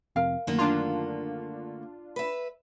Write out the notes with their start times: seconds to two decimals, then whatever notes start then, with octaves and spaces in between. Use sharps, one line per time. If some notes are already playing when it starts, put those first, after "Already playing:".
0.16 F2 C3 A#4 F5
0.47 F#2 D3 D#3 A3 A#3
0.59 D4 F4 A#5
2.16 B4 E5